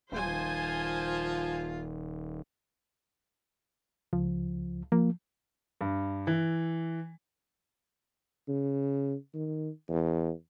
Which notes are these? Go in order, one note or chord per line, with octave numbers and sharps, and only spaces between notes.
D#1 F3 F4 C5 G#5
C#2 F3
F3 A#3
G2
E3
C#3
D#3
E2